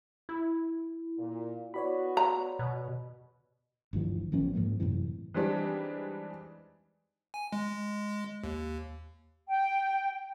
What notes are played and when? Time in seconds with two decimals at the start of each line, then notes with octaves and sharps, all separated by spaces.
0.29 E4
1.18 A#2
1.74 B3 F#4 C#5 D5 B5
2.17 A#5
2.59 B2
3.93 G1 D2 E3 F3
4.32 A1 F3 B3 C#4
4.55 G#2 F3 A#3
4.80 F#2 A2 C3 E3
5.34 E3 G3 G#3 C4 D4 D#4
7.34 G#5
7.52 G#3
8.44 D#2
9.49 G5